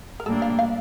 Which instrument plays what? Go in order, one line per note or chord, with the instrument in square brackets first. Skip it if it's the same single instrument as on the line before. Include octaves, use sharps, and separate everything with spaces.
[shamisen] A#4
[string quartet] A2 G3 A#3 D4 [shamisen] A4
[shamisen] F5
F5